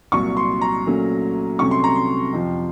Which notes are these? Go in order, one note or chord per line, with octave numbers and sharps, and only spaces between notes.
C2 A#2 F#3 C#6
C6
A#5
A#2 F#3 A3 C#4
C2 C3 F#3 A3 C#4 C#6
C6
A#5
C6
F2 C3 F3